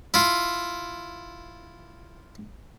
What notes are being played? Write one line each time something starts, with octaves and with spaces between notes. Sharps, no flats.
E4 F4